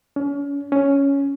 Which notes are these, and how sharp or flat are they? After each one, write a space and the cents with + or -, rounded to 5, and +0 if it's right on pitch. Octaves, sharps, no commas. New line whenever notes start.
C#4 +35
C#4 +5